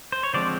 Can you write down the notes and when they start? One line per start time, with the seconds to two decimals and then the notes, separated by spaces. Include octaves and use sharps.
0.12 C5
0.23 C#5
0.33 D3 F3 G#3 C4 C5 D5